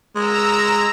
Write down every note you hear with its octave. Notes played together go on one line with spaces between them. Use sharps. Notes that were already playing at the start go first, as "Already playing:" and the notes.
G#3 A#5 E6